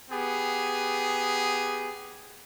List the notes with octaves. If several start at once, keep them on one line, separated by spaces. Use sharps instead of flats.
B3 G4 G#4